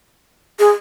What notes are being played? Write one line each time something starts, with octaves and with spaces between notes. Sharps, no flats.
G#4